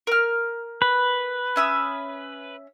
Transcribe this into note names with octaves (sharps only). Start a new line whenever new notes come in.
A#4 F6
B4
C#4 E5 D#6